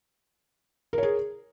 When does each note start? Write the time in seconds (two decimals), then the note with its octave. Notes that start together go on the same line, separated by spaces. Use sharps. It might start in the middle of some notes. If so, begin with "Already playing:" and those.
0.93 A#4
0.98 C#5
1.03 G#4